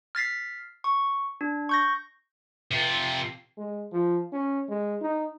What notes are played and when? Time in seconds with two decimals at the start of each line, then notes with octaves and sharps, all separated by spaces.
0.15 F6 A6 B6 C7
0.84 C#6
1.41 D4
1.69 C#6 G6 A#6
2.71 C3 F4
3.57 G#3
3.92 F3
4.32 C#4
4.68 G#3
5.01 D#4